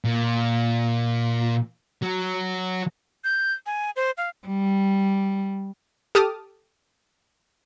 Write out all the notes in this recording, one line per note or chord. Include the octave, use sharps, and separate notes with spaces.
A#2
F#3
G6
G#5
C5
F5
G3
G4 A4 A5 D6 D#6 F6